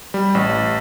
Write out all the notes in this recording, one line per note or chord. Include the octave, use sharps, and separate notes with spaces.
G3
A1